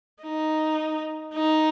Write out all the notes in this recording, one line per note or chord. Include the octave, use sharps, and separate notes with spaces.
D#4
D#4